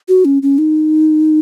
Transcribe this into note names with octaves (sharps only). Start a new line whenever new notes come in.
F#4
C#4
C#4
D#4